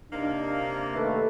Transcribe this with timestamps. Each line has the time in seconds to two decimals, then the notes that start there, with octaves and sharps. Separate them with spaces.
0.13 C3 A#3 D4 D#4
0.95 D#2 D#3 A3 A4 B4 E5